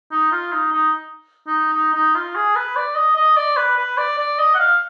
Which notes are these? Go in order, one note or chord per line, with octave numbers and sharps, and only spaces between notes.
D#4
F4
D#4
D#4
D#4
D#4
D#4
F4
G#4
B4
D5
D#5
D#5
D5
B4
B4
D5
D5
D#5
F#5
F5